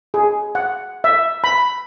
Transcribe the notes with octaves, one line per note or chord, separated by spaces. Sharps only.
G#4
F#5
E5
B5